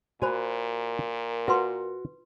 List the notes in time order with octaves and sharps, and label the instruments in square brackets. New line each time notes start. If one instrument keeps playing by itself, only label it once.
[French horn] A#2 [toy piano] F#4 C5 B5 [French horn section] A#4 [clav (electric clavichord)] G#5
[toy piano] F4 B4 C6 [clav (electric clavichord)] F#4